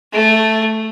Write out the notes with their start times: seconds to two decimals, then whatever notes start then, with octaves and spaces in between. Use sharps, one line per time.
0.13 A3